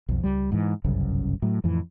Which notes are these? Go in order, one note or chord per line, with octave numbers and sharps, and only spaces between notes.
B1 F2
C#2 G3
G#2 E3
G1 C2 F#2 C#3
A2 F#3
F2 A2 E3